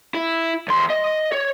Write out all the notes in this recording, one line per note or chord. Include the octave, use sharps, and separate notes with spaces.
E4
E2 C6
D#5
C#5